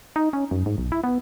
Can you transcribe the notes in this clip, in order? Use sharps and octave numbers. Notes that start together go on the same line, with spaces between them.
D#4
C#4
F#2
G#2
B1
E4
B3